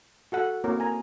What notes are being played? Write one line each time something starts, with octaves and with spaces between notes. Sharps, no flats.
F#4 A4 F#5
A#3 C4 E4 F#4 A#4 C#5
G#5 A#5